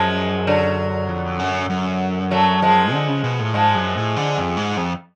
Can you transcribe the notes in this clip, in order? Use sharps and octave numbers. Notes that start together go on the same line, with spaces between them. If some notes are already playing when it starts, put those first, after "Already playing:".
Already playing: F#2 F3 G#3
D3 F#3
F2
F#2
F#2
F#3 A3
F3 G#3
D3
C#3
B2
A2
G#2 F3 G#3
F#2
A2
D3
F2
G#2
F2